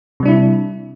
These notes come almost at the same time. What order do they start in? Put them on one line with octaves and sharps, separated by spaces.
C3 G3 D4 E4